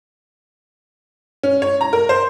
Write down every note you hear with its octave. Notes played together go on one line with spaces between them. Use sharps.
C#4
C#5
A#5
A#4
C5